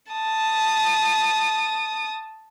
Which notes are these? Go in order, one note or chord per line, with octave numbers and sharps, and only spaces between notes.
A5 D#6